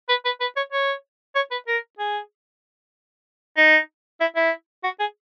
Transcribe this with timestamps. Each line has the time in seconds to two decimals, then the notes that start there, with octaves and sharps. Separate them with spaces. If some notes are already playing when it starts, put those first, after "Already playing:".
0.09 B4
0.25 B4
0.41 B4
0.56 C#5
0.72 C#5
1.36 C#5
1.51 B4
1.67 A#4
1.99 G#4
3.57 D#4
4.20 E4
4.36 E4
4.84 F#4
5.00 G#4